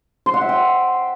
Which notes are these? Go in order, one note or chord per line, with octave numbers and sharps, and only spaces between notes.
C5
F#5
E5
G5